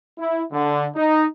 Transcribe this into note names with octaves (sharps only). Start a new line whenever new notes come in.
E4
D3
D#4